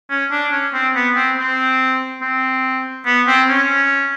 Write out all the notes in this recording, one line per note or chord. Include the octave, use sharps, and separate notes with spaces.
C#4
D4
C#4
C4
B3
C4
C4
C4
B3
C4
C#4